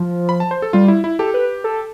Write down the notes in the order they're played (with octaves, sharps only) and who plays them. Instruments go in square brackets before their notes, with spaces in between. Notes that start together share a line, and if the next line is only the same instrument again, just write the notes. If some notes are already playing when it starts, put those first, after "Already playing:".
Already playing: [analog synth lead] F3
[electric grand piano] B5
A5
C5
A4
[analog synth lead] G3 [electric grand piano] F4
[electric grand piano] E4
E4
[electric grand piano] G4 [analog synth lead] A4
[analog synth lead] B4
A4